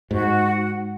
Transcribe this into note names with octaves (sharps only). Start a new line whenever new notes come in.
G#2 F#4
F#5